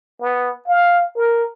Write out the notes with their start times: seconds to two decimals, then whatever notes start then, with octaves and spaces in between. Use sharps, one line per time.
0.21 B3
0.67 F5
1.17 A#4